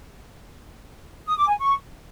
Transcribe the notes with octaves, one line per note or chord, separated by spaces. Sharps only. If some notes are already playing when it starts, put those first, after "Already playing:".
D#6
D6
G#5
C#6